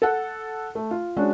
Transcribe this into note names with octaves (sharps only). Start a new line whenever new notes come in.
A4 F#5
A3
F4
G#3 C#4 D4 F#4